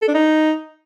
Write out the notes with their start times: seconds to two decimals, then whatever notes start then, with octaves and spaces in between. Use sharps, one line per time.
0.02 A4
0.08 D4
0.14 D#4